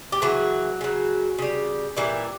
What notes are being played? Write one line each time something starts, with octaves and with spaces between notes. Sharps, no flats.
G4
C#3 E3 F#3 F#4
C#3 F#3
C#3 G3
A#2 E3 G3 E4